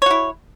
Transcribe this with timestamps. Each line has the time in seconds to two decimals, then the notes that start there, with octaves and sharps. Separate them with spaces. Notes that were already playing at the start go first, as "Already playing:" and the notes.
0.02 C#5
0.06 F#4
0.11 E4